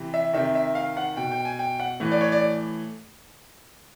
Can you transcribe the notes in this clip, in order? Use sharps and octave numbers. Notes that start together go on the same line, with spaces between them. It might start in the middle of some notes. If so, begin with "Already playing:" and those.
Already playing: C3 E3
E5
C3 D#3 E5
E5
F5
F#5
B2 G5
G5
G#5
G5
F#5
A2 E3
D5
C#5
D5